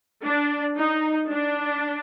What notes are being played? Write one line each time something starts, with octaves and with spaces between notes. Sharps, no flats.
D4
D#4
D4